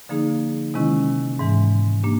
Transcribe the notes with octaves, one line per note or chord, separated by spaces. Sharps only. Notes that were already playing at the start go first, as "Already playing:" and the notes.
D3 F3 A#3 D#4 G#4
C3 D#3 G#3 C#4 E4
G#2 E3 G#3
A#3 D4 G4